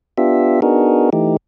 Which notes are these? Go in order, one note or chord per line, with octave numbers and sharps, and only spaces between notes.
B3 D4 F4 G4 E5
B3 D4 D#4 F#4 G#4 A#4
E3 A3 D#4 G4